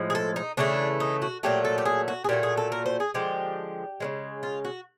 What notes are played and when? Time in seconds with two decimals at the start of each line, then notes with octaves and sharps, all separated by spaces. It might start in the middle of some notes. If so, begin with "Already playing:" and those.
Already playing: A2 F3 G#3
0.10 G#4
0.15 A4
0.36 D#4
0.57 C#3 E3 A3 D4
1.00 D#4
1.22 F#4
1.43 A#2 F#3 A3 G4
1.65 A4
1.78 G4
1.85 G#4
2.08 F#4
2.24 G#4
2.29 A#2 F#3 A3 G4
2.43 G#4
2.57 A4
2.72 A#4
2.86 C5
3.00 G#4
3.14 D3 F3 G#3 G4
4.00 C#3 F3 G#3
4.43 F4
4.65 F#4